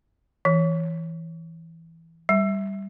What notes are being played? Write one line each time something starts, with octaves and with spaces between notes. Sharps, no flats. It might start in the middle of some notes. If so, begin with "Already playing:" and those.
E3
G3